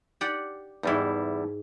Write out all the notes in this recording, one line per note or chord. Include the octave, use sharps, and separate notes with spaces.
G4 D5 F#5
E2 G#2 G3 D#4 E4